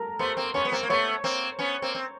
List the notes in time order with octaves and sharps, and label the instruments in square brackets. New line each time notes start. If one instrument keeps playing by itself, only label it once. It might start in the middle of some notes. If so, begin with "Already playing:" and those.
Already playing: [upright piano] A4 A#4 A#5
[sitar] A3 B3 [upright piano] C5 C6
[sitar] A#3 C4
[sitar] B3 C#4 [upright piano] C#5 C#6
[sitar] B3
A#3 C4
A#3
[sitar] A3 B3 [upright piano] C#5 C#6
[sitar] A#3 C4
B3 C#4
A#3 C4
C4